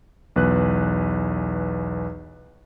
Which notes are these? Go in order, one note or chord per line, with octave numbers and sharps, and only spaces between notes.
B1 E2 B4 F#6